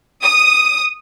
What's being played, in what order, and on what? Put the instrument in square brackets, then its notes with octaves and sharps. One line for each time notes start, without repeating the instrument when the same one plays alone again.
[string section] D#6